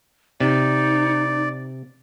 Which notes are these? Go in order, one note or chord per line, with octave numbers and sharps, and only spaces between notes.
C3 D#4 D5